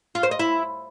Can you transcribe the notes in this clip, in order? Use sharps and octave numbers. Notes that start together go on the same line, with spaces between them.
F4
C5
D#5
E4